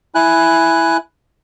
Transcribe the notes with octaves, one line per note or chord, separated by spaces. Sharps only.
E4 G#5 F#6